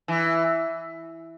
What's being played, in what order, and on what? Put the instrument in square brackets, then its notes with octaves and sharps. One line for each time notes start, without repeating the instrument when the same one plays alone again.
[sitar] E3